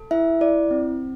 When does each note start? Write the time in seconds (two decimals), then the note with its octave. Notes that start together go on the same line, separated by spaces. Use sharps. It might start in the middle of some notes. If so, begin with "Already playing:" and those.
Already playing: A4
0.11 E4 E5
0.41 E4 D5
0.71 C4